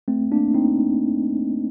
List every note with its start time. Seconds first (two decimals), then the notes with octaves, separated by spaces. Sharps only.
0.08 A3 C4
0.32 A#3 D4
0.54 C4 D#4